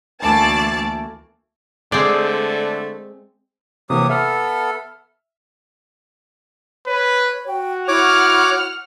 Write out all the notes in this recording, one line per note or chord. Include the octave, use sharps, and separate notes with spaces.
D2 E3 A3 A#3 D5 A5
D3 G#3 A3 C4 G#4 D5
C3 E3 F#3 A#3 G4 D#6
B3 A4 E5 F6
B4 C#5
F#4 G5
E4 C#5 F#5 D6 F6